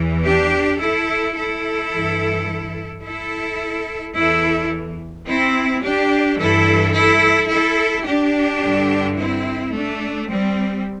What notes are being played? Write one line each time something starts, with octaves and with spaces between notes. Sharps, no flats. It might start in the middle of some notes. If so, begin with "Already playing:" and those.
Already playing: E2 E3
D4 G4
E4 A4
E4 A4
G2 E3
E4 A4
E2 E3 E4 A4
C4 E4
D4 G4
G2 E3 E4 A4
E4 A4
E4 A4
D4 G4
G2 D3
C4 E4
A3 D4
G3 C4